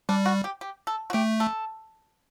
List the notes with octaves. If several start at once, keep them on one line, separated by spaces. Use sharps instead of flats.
G3 D4
F#4
G4
G4
A4
F#4
A3 G4
A4